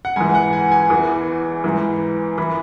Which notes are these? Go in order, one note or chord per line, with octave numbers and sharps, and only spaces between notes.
F#5
G#2 E3 G#5
F#5
G#5
G#5
E2 E3
G#2 E3
E3 B5